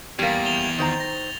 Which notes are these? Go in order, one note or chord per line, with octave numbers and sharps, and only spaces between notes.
E2 G3 A#3 G#6 A6
F7 G7
D#3 C5 A#5
A#6